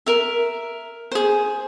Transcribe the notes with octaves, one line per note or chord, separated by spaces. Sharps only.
A#4 E5
G#4 C5